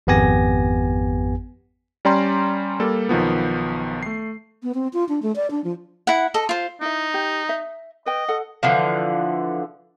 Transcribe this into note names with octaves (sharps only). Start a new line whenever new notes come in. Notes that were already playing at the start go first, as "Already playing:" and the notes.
G#1 F2 B3 G4 G#5 A#6
G3 C#4 D5 G5 A#5 C6
G3 A#3 A4
B1 D#3 F3 B3
A3 C7
B3
C4
F4
D4
A3
D5
D4
F3
E4 F#5
A4 D#5
F4 C5
D#4 E4 E5
G4
E5
B4 D#5 G5
A4 F#5
D3 E3 F3